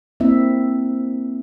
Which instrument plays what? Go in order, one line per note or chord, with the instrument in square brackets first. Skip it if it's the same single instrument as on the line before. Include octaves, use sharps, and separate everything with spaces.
[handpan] A#3 C4 E4 E5